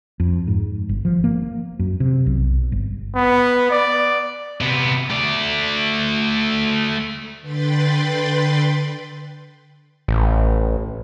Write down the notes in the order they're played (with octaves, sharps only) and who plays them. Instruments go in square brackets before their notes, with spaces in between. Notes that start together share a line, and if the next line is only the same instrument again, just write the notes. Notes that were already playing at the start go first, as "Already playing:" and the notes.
[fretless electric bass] F2
G#2
G1
F3
A#3
F#2
C3
B1
G1
[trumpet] B3
D5
[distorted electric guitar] C3 B3
A3 D5
[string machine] D3 B4 G5 B5 C6 A6
[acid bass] A1